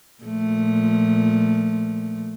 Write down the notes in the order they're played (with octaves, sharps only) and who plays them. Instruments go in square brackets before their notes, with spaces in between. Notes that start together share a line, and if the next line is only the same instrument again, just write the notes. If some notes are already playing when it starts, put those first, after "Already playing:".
[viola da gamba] A#2 F3 A3